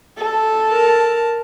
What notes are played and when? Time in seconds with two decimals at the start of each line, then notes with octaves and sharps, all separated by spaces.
0.18 A4
0.68 A#4 A5